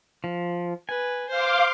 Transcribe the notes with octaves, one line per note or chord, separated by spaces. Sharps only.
F3
B4 G#5
C5 F5 C6 D6